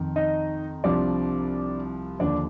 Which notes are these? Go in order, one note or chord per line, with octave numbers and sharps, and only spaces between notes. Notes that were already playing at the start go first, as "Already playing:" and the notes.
Already playing: F2 D#3
D#4 D#5
C2 C3 F3 D4 D5
D#2 D3 F3 D4 D5